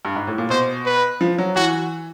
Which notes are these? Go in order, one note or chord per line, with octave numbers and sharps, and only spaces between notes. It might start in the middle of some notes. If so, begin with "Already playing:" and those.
G2
G#2
A2
A#2
B2 C5
B4
F3
F#3
E3 F#4